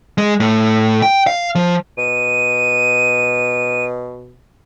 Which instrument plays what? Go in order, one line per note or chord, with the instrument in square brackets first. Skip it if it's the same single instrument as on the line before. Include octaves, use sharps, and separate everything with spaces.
[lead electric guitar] G#3
A2
G5
F5
F3
[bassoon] B2 [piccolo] D#7